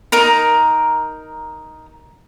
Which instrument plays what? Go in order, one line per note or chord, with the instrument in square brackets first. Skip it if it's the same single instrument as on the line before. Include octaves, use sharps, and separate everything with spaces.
[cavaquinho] D#4 A#4 A#5